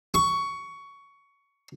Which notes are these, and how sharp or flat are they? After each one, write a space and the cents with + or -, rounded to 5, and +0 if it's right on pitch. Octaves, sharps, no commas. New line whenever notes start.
C#6 +15